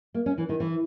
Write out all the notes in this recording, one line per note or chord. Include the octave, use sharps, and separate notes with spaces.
A#3
C#4
E3
D#3
E3